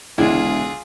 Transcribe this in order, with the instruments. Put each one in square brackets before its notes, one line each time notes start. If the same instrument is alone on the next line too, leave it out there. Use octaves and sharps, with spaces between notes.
[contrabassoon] E1 [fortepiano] C#2 D3 G#3 [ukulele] E4 [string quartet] F4 G#4